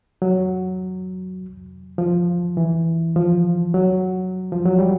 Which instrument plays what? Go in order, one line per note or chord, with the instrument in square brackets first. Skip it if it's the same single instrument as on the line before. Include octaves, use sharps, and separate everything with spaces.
[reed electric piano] F#3
F3
E3
F3
F#3
F3
F#3
G3